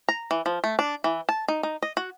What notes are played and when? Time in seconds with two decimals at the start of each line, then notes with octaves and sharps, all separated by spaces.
0.08 A#5
0.31 E3
0.46 F3
0.64 A3
0.79 D4
1.04 E3
1.29 A5
1.48 D#4
1.63 D#4
1.82 D#5
1.97 F#4